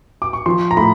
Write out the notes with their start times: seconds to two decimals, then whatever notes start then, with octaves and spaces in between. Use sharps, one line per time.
0.22 D6
0.33 C#6
0.46 F3 C6
0.71 A#5
0.77 A2 B5